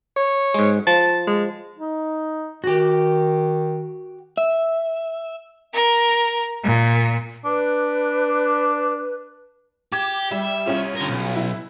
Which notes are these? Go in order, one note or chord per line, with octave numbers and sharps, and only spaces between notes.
C#5
G#2 G#3
F3 A5
G#3
D#4
D#3 F#4 G4
E5
A#4
A#2
D4 B4
G4 D6 G#6 E7
G3 E5
C2 C#4 F4
D3 A#4
B1
E4